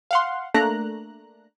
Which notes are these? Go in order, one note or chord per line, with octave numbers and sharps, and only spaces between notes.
F5 F#5 C6
A3 A#3 D4 A#5 F#6